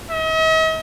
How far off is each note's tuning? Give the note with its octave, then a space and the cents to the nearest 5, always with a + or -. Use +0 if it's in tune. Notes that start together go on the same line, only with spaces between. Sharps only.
D#5 +45